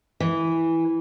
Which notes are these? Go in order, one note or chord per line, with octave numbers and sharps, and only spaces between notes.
E3